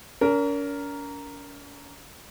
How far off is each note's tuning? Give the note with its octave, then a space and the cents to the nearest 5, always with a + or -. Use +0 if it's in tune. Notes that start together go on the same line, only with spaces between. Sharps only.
C#4 +45 A#4 +0